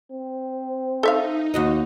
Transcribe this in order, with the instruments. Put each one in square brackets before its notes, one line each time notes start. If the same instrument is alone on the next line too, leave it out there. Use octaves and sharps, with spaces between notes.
[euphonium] C4
[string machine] D#4 [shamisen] A4 E5 F5
[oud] D#2 F#4 D#5